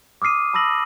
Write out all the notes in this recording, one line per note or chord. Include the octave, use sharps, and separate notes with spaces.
D6 D#6 F6 C7 D#7
A5 B5 D#6 E6 A#6 F#7